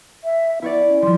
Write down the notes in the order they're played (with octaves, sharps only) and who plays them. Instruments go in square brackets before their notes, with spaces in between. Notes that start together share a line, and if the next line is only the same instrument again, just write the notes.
[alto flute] E5
[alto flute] B3 [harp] E4 C#5 D5
[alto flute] C#4
[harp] F3 G3 [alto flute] C6